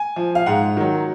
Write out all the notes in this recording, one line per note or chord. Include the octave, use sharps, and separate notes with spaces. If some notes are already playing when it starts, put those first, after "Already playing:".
Already playing: G#5
F3
F5
G#2 F#5
D#3 F#3